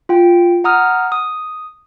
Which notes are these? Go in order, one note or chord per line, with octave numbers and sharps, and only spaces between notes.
F4 G5
F#5 A#5 D#6 F6
D#6